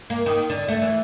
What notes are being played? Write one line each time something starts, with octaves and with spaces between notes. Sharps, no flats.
A#3
D#3
D3
A3
E3